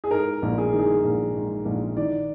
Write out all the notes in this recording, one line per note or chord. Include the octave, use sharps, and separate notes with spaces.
G#4
G#2 A#4
A#1
G#4
D#3
G#4
A#1
G#2
A#1
D#3 D5